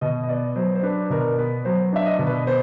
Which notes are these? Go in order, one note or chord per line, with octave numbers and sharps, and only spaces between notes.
B2 D#5
D#5
B3 D5
F#3 C5
C5
D4 B4
B2 A#4
B3 B4
F#3 C5
D4 E5
D#5
B2
B4
B3 C5